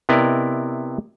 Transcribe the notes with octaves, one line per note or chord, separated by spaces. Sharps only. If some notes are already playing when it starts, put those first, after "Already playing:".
C3 B3 E4 A#4 D5 D#5